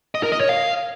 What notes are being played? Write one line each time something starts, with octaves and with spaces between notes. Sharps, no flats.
D#5
A#4
D#5
C#5
F5